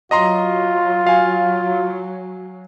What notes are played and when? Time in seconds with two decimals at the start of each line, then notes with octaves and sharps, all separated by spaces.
0.11 F#3 F4 D#5 A#5 C6
1.07 F5 G#5